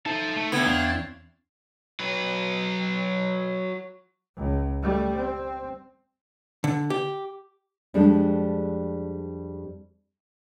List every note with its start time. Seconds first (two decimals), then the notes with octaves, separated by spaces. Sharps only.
0.06 D#4 A4 C5 E5 A5
0.36 A3
0.52 D2 D3 B3 E4 C#5 G5
0.66 E2 C4 D4 F5
2.00 F#3 B4
4.37 C#2
4.83 G3 A3
5.16 C4
6.64 D3
6.90 G4
7.94 F2 G3 G#3 D4